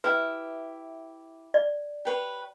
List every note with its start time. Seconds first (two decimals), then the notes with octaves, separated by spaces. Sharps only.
0.04 E4 G4 B4 E5
1.54 D5
2.05 G4 B4 C#5